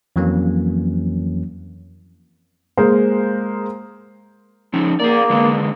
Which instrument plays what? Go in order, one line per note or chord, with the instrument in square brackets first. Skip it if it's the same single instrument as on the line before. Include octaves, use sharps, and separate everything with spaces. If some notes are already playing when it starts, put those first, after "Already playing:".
[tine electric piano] F2 E3 F#3 A#3 C#4
[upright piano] G#3 A#3 A#4 C5
[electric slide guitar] F3 C#4 D#4
[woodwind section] A#3 [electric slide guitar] G#4 D5
[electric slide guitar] D3 G#3 B3